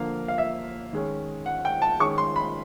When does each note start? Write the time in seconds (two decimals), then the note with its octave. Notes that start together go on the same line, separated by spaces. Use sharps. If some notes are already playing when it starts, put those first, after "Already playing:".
Already playing: D3 F3 A#3 F5
0.28 F5
0.38 E5
0.93 D#3 G#3 C#4
1.46 F#5
1.65 G5
1.82 A5
2.00 D#3 G#3 C#4 C#6
2.18 C6
2.36 B5